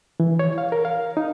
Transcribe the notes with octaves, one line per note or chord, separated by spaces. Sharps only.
E3
C#5
F5
A#4
F5
D#4